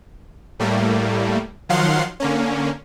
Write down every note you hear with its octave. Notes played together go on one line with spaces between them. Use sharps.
A2 G3 A3 A#3
D#3 F3 F#3 F5 F#5 C6
D3 A#3 C#4